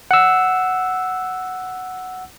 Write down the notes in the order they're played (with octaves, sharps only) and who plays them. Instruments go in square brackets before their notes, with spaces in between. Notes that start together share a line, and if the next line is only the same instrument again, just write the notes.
[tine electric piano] F#5 E6